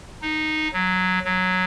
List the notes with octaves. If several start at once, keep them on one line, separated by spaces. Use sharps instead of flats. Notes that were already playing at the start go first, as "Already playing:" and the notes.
D#4
F#3
F#3